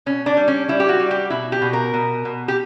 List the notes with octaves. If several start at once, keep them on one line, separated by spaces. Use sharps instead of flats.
B2 C#4
D4
G3
C#4
G3 E4
G4
F#4
G3
G4
B2 E4
G4
B2
A#4
B2
B2
G4